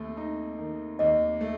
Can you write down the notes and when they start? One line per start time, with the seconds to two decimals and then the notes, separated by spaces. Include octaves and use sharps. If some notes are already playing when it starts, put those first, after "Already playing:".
Already playing: D#2 A3
0.17 D#4
0.59 D#3
0.99 D#2 D#5
1.41 A3